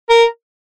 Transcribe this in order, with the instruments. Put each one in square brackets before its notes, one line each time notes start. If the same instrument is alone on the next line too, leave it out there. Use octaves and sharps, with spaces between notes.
[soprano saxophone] A#4